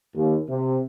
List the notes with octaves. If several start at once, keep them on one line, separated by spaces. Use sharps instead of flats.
D#2
C3